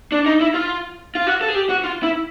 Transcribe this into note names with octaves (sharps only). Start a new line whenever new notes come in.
D4
D#4
E4
F4
F4
F#4
A4
G#4
G4
F#4
F4
E4